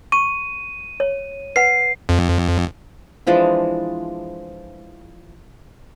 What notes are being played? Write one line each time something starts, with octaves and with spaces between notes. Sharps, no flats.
C#6 D#7
C#5
B4 F#5 C7
F2
E3 F3 G#3 D4